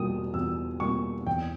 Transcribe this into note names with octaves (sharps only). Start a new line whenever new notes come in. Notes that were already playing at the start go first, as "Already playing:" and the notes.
Already playing: E2 B2 G3 A#3 D#6
E2 E6
B2 G3 A#3 C#6
E2 G5